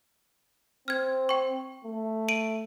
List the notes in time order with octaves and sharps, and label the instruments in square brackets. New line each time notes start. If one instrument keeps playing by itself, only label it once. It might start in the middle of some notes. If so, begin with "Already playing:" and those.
[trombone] C4 [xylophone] F6 G#6
[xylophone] G5 C#6
[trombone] A3
[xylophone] D7 D#7 F#7